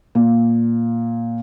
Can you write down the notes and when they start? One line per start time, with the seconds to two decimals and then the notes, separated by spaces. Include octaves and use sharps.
0.15 A#2